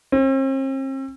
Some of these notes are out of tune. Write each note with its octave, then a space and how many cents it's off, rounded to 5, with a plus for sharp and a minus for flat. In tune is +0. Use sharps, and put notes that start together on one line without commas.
C4 +45